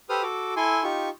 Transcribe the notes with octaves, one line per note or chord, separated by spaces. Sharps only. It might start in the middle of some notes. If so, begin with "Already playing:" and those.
G4 A4 B4 C5 D#6 F6
F#4 A4 D6
E4 A4 G#5 C6
D#4 F4 G4 C#6